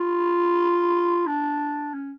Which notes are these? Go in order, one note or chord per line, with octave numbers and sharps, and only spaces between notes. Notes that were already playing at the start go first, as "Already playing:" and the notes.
Already playing: F4
D4
C#4